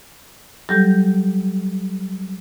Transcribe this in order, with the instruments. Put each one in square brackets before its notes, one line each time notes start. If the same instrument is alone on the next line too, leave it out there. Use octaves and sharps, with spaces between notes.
[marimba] F#3 G3 G4 A4 G6 A#6